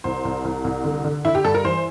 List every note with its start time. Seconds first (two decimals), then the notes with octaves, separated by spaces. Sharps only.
0.04 C2 C5
0.25 C2
0.45 C2
0.64 C2
0.84 D3
1.04 D3
1.25 D3 E4
1.35 G4
1.44 G2 A4
1.54 A#4
1.65 E3 C5